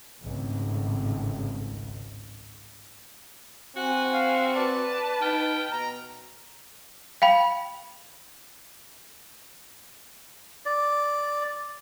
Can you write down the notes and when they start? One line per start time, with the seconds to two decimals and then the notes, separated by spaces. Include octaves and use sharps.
0.21 G#1 C#2 A2
3.76 C4 F#4 F#5 G#5
4.12 F5
4.54 B4 D5 A5
5.21 D#4 G5 F6
5.71 B2 A#5
7.22 F5 G5 B5
10.66 D5